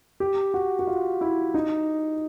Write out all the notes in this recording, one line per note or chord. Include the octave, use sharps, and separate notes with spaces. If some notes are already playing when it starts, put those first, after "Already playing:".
G4
F#4
F#4
F4
E4
D#4